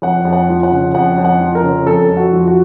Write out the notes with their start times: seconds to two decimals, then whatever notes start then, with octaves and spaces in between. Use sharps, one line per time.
0.02 F2 F#5
0.25 F2
0.33 F#5
0.49 F3
0.63 F#5
0.72 C#3
0.94 F2 F#5
1.18 F2
1.25 F#5
1.41 F3
1.55 A#4
1.63 C#3
1.86 F2 A4
2.09 F2
2.17 F#4
2.33 F3
2.47 F#4